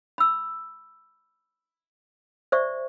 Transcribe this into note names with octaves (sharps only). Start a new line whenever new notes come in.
B5 E6
C5 D5 E5 C#6